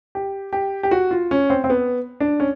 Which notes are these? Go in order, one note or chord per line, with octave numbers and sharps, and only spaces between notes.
G4
G4
G4
F#4
F4
C#4
C4
C4
B3
D4
C#4